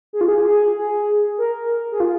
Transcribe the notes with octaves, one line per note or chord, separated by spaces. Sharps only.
G#4
F4
G#4
G#4
G#4
A#4
G#4
F4